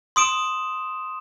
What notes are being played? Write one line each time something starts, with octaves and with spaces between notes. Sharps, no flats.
C6 D#6 D7 E7